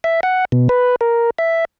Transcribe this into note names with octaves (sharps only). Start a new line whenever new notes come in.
E5
F#5
B2
B4
A#4
E5